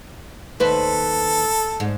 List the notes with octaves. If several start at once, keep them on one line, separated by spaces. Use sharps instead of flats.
D#2 A4 B4 C5
G#2